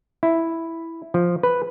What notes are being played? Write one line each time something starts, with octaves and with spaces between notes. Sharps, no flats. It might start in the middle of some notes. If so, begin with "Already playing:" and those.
E4
F3
B4